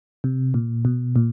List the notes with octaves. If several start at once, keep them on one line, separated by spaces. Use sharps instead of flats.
C3
A#2
B2
A#2